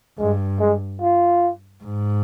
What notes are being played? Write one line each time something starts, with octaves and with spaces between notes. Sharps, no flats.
G2 G#3
G#3
F4
G#2